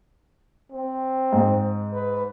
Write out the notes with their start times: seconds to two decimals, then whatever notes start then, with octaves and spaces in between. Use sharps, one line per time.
0.72 C4
1.33 G#2
1.93 B4